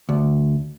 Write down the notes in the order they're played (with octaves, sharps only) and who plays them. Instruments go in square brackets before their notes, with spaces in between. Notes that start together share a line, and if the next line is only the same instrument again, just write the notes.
[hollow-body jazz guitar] D2